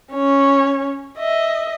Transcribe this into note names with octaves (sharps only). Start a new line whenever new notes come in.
C#4 C#5
D#5 E5